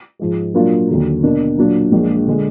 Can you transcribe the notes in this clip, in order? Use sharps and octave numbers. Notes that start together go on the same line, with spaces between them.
G#2 F3 G#3
A#2 F#3 A#3 D4 F4
D#2 D3 F#3
B2 A#3 D4
A#2 F#3 D4 F4
A#1 A#2 F3 G#3 D4
D3 G#3